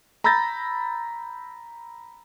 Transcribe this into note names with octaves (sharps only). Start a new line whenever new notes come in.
A#5 B5 E6 G6 A6 A#6